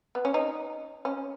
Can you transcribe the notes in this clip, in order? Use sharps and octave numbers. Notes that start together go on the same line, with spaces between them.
B3
C#4
D#4
C#4